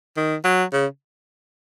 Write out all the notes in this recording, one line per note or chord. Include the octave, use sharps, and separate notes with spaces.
D#3
F#3
C#3